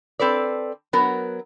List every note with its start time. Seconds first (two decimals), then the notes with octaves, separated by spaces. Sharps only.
0.19 C4 A4 B4 D5
0.93 F#3 B3 A#4